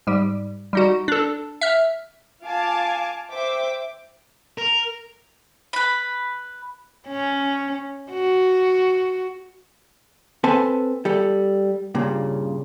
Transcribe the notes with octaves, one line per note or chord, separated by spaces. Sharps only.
G#2 G3
G3 D#4 F#4
D4 A4
E5 F6
F4 F5 G#5 A5 D6
C5 E5 G5 D6
A#4
B4 B5
C#4
F#4
C4 A4 B4 G#5 A5
G3 A4
G2 A#2 C#3